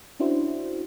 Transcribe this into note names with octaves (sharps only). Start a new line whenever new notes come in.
C#4 D4 E4 F#4 C5